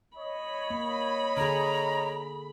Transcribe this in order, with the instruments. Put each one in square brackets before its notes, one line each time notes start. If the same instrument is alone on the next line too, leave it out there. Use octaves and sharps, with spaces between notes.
[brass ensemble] C#5 D#5 [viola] B5
[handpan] A#3
[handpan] D3 G#4 [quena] A#5